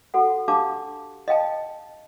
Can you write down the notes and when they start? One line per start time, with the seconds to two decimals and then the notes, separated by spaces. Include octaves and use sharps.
0.14 F#4 A4 F#5
0.48 D4 G4 F5 A5 D6
1.28 D#5 F5 G5 A5